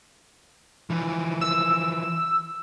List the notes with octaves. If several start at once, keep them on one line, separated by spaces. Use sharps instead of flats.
E3 F3
E6